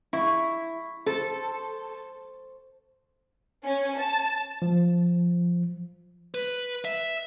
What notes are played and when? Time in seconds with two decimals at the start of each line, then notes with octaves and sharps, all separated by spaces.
0.13 E4 C#6
1.06 A4 C5
3.65 C#4
3.98 A5
4.62 F3
6.34 B4
6.85 E5